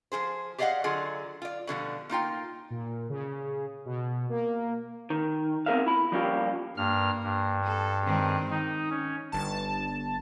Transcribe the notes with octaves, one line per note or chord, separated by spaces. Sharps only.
F3 F#3 G#4 C5
G4 G#4 D5 D#5 F5 F#5
D3 F#3 F4 G#4 D5
F4 D5
B2 D3 F3 G3
A#3 D#4 F4 G5
A#2
C#3
B2
A#3
D#3
B3 C4 G#4 A#4 E5 F5
E4 B5
F3 G3 A#3 C#4 F4 G4
G2 A#3 F6
G2
A4
D#3 G#3 C4
D#3 D#4
C#4
G1 A5